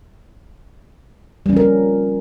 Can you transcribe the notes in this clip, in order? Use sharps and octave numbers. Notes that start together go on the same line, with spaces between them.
F3 G3 C#4 A#4